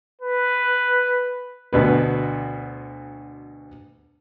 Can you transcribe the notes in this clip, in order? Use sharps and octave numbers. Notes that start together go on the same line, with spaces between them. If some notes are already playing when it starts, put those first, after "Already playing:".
B4
D2 B2 B4